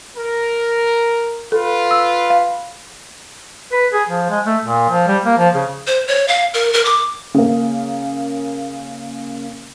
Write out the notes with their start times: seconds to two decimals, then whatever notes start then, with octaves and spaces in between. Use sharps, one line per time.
0.17 A#4
1.52 F4 A4 B4
1.91 E6
2.30 F5
3.72 B4
3.93 G#4
4.09 F3
4.30 G#3
4.46 A3
4.63 A#2
4.90 F3
5.07 G3
5.25 A#3
5.38 F3
5.55 C#3
5.87 C5
6.08 C#5
6.28 F5
6.54 A#4
6.74 A#4
6.85 D6
7.34 C#3 A#3